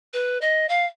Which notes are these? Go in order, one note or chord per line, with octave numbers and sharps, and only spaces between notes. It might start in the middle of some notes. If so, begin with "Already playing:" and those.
B4
D#5
F5